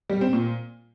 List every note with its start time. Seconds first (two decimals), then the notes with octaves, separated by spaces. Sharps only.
0.10 G3
0.21 C4
0.33 A#2